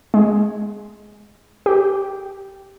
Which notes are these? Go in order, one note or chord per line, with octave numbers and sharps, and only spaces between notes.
G#3
G4